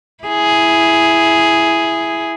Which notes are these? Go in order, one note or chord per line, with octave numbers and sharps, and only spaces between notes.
E4 G#4